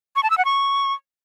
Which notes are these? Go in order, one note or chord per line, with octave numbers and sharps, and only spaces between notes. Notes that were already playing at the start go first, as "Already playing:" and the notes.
C#6
A5
E6
F#5
C#6